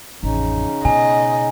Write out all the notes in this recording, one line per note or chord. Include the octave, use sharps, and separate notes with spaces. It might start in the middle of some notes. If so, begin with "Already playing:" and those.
A1 F2 C#3 C#4 D#4
B2 D#5 G#5